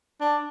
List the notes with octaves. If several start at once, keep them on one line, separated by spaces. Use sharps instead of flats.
D4